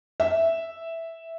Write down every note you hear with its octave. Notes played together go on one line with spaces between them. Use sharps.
E5